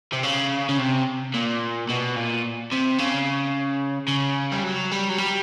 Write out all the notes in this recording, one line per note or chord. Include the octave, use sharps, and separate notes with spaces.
C3
C#3
C#3
C3
A#2
B2
A#2
C3
C#3
C#3
G3
F#3
G3
F#3
G3